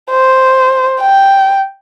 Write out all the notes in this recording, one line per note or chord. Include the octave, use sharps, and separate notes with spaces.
C5
G5